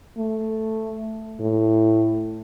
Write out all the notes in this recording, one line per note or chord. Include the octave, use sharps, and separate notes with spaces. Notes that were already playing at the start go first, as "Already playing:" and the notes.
A3
A2